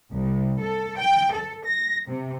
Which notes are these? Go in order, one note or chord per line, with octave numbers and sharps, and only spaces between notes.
C2
A4
G5
A4
A#6
C3